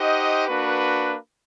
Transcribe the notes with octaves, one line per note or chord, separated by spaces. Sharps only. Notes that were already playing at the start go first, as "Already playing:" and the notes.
Already playing: D#4 G4 C5 D#5 F#5
A#3 D4 F#4 B4